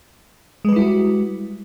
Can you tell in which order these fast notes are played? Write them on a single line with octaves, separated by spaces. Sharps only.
G#3 B4 G3 E4 F#4